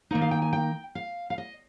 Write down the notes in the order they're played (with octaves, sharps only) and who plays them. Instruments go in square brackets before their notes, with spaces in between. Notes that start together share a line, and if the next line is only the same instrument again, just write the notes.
[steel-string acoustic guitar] D#3 A#3 D#4
F5
G5
G#5
G5
F5
F5
D#5